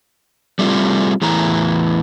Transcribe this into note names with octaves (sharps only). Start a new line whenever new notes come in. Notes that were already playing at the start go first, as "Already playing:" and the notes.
G3 A3 C4 F4
E2 A2 E3 A#5